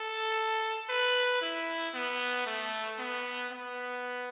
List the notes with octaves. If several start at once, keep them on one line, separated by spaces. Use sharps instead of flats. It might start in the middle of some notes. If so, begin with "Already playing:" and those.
Already playing: A4
B4
E4
B3
A3
B3
B3